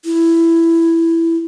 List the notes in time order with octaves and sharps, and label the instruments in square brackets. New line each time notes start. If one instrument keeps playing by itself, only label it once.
[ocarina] E4